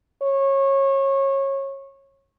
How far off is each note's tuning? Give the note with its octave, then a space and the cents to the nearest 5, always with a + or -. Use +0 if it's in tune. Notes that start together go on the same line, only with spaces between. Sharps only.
C#5 -25